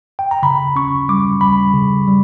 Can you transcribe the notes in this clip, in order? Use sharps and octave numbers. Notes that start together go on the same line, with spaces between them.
G5
A#5
C#3 B5
C#4 C#6
G3 D6
G3 B5
C#3
G3